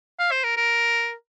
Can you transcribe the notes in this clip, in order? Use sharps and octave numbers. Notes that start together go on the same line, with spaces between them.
F5
C5
A#4
A#4